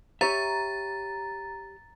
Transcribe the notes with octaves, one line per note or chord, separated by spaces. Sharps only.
G4 C#5 E5 A#5 A6